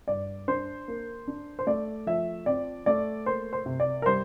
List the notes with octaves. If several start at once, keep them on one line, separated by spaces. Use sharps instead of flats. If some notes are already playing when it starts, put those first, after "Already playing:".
G2 D5
D4 C5
A#3
D4
C5
A3 D5
F3 E5
C4 D5
A3 D5
A#3 C5
C5
C3
D5
A#4
G3 C5